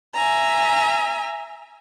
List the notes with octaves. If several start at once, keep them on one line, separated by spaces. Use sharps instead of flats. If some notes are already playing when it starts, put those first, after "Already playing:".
E5 G#5 A#5